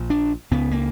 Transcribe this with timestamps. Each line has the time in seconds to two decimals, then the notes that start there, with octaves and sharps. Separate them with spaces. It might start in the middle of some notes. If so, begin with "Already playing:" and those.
Already playing: A#1 A#2
0.10 D4
0.51 C#2 C#3 B3
0.71 A#3